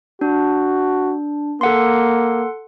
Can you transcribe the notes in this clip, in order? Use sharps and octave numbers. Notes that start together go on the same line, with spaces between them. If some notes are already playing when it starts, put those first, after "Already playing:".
D4 F#4
A#3 A4 F#5 C6